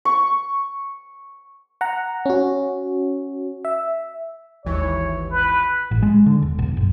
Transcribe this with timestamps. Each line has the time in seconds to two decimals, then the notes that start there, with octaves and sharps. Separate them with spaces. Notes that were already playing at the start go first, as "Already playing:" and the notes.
0.05 C#6
1.81 F#5 A#5
2.26 C#4 F#4
3.65 E5
4.65 G#1 D#2 E3 C#5
5.31 B4
5.91 A1
6.02 G#3
6.26 D3
6.42 E1
6.59 B1
6.77 F#1